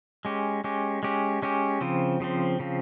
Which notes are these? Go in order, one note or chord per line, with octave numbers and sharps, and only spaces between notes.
G#3 C#4 G4
G#3 C#4 G4
G#3 C#4 G4
G#3 C#4 G4
C#3 F3 C4
C#3 F3 C4
C#3 F3 C4